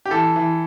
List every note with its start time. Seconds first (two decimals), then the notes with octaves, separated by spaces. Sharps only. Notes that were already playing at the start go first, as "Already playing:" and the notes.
0.05 G4
0.11 E3 A4
0.36 E3